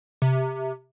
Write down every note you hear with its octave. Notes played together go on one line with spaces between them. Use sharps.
C3